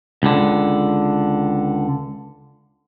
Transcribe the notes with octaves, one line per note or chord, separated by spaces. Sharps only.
C#2 D3